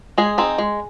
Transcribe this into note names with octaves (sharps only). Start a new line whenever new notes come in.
G#3 G#4
C4 D#4
G#3